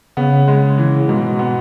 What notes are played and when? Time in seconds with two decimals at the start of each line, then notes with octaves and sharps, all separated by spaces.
0.17 C#3 B3
0.48 G#3
0.78 E3
1.08 G#2 B2
1.39 B3